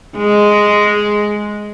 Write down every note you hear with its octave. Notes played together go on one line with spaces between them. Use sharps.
G#3